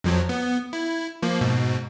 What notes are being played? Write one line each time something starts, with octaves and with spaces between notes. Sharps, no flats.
F2 F3 F#3
B3
E4
F3 A#3
G#2 B2